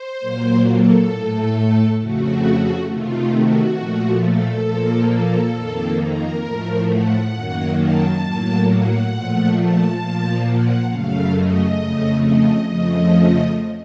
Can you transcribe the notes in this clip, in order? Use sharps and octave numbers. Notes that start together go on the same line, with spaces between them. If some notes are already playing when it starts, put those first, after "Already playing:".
Already playing: C5
A#2 F#3 A#3
A4
A2 A3
F2 C#3 A3 F#4
C3 D#3 A3 F4
F#4
A#2 F3 A3
A4
A#2 F3 A#3
A4
F2 D#3 A#3
A#4
A2 F3 A3
F#5
F#2 D#3 F#3 A#3
A5
A2 F#3 A#3
F#5
A#2 F3 A3
A5
A#2 F3 A#3
F#5
F#2 C#3 A3 F5
D#5
F2 C#3 A3
D#5
F2 C#3 F3 A3 D#5